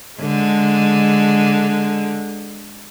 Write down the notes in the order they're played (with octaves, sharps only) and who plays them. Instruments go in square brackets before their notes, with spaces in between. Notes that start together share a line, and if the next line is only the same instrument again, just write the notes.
[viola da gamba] D3 G#3